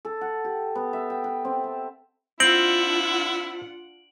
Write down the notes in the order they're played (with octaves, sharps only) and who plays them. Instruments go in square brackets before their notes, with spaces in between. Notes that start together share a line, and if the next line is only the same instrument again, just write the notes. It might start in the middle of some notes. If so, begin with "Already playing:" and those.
[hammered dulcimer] A4
F#5
G4
B3
E5
G5
B4
C4
A5
[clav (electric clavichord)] C4 [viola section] D4 F4 F#5 [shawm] E4 [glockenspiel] D7 F#7